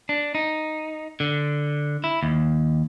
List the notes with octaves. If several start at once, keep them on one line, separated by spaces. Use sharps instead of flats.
D4
D#4
D3
E4
D#2